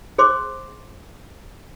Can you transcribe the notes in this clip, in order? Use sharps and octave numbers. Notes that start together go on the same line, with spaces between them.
G#4 C5 C6 D6